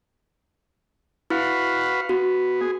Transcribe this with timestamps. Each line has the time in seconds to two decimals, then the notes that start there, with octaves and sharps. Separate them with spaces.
1.30 E4 F#4 B4 F5
2.09 B3 F#4
2.61 G#4